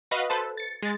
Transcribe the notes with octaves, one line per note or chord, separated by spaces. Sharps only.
F#4 B4 D#5 F5
A4 B4 C5 A5
A6 C#7
G#3 A6